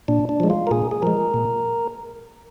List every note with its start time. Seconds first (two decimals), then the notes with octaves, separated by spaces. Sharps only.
0.08 A#2 D4
0.29 D4
0.40 F3 G#3
0.50 F4
0.67 A#4
0.71 A#2 G#4
0.91 G#4
1.02 F3 G#3 A#4
1.34 A#2